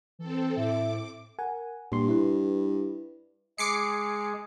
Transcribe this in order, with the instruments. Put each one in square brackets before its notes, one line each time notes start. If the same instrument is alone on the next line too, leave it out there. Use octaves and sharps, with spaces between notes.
[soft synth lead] E3 [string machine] C4 A4
[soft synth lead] A2 [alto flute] E5 [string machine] D6
[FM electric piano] A#4 F#5 G#5
[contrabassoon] G2 [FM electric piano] A#2 C6
[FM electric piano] E4 B4
[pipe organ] G#3 G#4 [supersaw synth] D6 C7 C#7